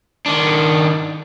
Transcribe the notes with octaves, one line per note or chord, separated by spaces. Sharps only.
D#3 D4